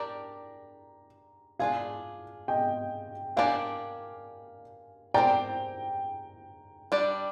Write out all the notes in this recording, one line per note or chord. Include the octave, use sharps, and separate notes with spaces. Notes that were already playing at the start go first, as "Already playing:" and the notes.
Already playing: D4 G4 A#4 D5 A#5
D4 F4 G#4 F5 G#5
D#5 G5
A#3 D4 G4 D5 F5 G#5
C4 G4 A#4 D5 G5 A#5
G3 D4 G4 D5